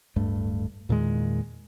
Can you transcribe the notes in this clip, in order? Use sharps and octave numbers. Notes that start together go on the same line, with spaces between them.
D1 G2 A3
E2 A#2 D#3 G#3